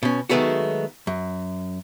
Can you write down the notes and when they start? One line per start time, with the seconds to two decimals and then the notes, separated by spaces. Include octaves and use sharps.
0.03 B2 C#4
0.29 D#3 F#3 G#3 A3 B3 F#4
1.07 F#2